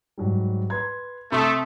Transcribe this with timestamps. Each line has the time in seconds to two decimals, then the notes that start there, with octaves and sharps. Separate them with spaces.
0.18 G#2 F#3 G3
0.70 B4 C6 G#6
1.32 C3 A3 C6 D#6